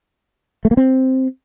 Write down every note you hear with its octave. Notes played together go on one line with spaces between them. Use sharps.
A3
A#3
C4